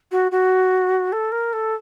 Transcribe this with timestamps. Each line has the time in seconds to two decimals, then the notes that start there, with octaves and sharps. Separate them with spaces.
0.11 F#4
0.31 F#4
1.12 A4
1.31 A#4
1.53 A4